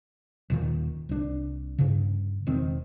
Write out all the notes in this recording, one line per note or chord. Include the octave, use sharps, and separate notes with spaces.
D#1 A#2 D#3
C2 D4
G2 C#3
E1 D#3 C4